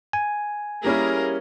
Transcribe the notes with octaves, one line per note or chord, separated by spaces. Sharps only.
G#5
G3 A#3 C#4 E4 G#4 A#4